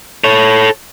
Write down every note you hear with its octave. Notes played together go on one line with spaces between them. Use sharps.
A4 C#5